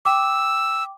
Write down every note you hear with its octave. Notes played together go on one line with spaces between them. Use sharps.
G5 D6 E6